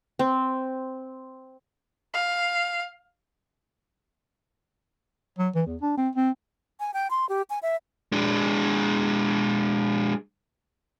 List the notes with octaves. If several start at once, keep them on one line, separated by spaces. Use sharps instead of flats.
C4
F5
F#3
E3
E2
D4
C4
C4
G#5
G5
C6
G4
G#5
E5
G#3 D4